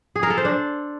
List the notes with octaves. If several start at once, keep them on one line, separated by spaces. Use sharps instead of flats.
G#4
A#4
A4
C5
D4